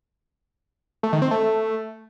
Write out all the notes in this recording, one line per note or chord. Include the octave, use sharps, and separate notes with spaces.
A3
D#3
C4
A3